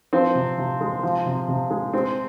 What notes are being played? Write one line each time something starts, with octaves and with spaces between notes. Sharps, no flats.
F3 C4
C3
C3
G#3
F3
C3
C3
G#3
G#3 C4